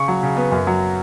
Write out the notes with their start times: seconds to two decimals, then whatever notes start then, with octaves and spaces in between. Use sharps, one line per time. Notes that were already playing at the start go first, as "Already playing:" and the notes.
Already playing: C#3 C#6
0.08 F#3
0.23 C#3
0.37 B3
0.52 F#2
0.67 F#3